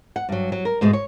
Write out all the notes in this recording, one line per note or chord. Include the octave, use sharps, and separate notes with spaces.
F#5
G2 F#3
F#3
A#4
G#2 B2 G#3 A3
C#5